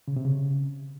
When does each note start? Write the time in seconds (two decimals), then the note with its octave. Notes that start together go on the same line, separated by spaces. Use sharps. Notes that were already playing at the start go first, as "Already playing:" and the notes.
0.08 C#3
0.16 C3
0.25 C#3